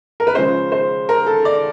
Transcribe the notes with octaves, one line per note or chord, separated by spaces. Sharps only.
A#4
B4
C#3 F3 G#3 C#4 C5
C5
A#4
A4
D5